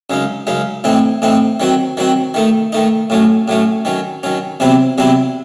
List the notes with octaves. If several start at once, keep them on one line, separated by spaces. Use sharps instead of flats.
F#2 C#3 G#3 D#4
F#2 C#3 G#3 D#4
A2 E3 C4 D#4
A2 E3 C4 D#4
D#3 F#3 C4 F#4
D#3 F#3 C4 F#4
D#3 A3 D#4
D#3 A3 D#4
A2 F#3 A3 C#4
A2 F#3 A3 C#4
D#3 F#3 C#4
D#3 F#3 C#4
E2 C3 F#3 C4 E4
E2 C3 F#3 C4 E4